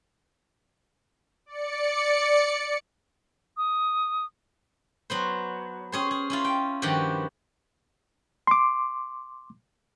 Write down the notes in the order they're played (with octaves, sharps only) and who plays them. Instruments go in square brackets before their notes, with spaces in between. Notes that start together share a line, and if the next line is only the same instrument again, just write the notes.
[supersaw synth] D5 C#7
[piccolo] D#6
[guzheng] F#3 B3 C5
C#4 G#4 C5
G#4
C#4 E4 F4
G5
G2 D#3 F3 B3 F#4 G4
[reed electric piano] C6 D6